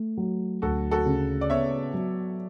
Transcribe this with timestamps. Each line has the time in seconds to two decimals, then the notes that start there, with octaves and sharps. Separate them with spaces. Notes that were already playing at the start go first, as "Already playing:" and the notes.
Already playing: A3
0.18 F#3
0.62 D2 F#4 A4
0.91 F#4 A4
1.06 C#3
1.41 D5
1.50 B3 C#5 E5
1.94 F#3